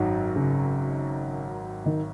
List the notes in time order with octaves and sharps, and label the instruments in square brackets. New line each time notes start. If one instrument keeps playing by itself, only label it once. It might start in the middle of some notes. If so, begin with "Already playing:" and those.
Already playing: [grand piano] G#1 F#2 F#3 D#4 F#4
[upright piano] C#3
D#3